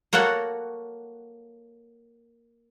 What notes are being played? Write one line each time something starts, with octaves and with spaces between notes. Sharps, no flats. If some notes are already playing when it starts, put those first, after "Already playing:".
A#3 F#4 A4 C#5 F#5